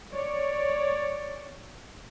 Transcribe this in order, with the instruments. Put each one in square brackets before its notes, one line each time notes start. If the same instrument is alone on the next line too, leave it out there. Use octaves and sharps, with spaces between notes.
[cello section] C#5 D5